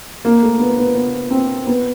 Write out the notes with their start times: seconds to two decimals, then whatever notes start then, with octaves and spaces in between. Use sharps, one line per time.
0.25 A#3
0.42 A3
0.59 B3
0.77 B3
0.96 B3
1.31 C4
1.67 B3